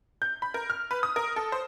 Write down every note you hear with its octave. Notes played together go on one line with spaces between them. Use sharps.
G6
B5
A#4
F6
B4
D#6
A#4
A4
C5